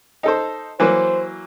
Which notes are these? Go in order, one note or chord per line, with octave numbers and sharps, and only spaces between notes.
D#4 A4 C5
E3 F#3 A#3 C5